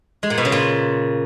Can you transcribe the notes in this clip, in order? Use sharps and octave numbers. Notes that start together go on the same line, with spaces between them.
G#3
A#2
B2
C#3
A#2